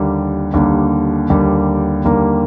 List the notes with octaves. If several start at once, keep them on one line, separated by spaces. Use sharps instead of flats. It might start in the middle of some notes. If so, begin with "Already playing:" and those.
Already playing: D#2 D3 G3 A#3
D#2 D3 G3 A#3
D#2 D3 G3 A#3
D#2 D3 G3 A#3